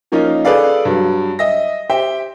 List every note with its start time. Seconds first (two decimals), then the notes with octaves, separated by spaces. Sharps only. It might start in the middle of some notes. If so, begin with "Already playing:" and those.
0.12 F3 A#3 C#4 D#4 F4
0.45 G#4 A4 B4 D5 F5
0.85 G2 F#3
1.39 D#5 E5 A#6
1.90 G4 C5 E5 G5